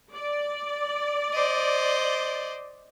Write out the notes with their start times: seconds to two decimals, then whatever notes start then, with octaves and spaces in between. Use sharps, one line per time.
0.13 D5
1.33 C5 D#5